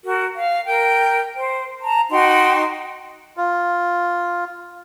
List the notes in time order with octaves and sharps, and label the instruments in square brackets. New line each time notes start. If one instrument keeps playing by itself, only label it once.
[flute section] F#4 A#4
F5
A#4 G5
C5
A5 A#5
D#4 F#4 G5 C6
[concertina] F4